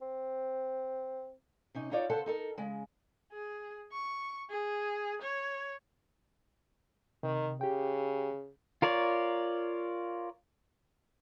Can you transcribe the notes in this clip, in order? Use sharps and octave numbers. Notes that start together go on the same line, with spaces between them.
C4
C3 C#4 D#4
D#4 F4 C#5 D5 E5
C#3 A4 B4 C5 F#5 A5
D#4 A4 A#4
C#3 G#3
G#4
C#6
G#4
C#5
C3 D#3
C#3 G4 G5
F4 A#4 C#5 D5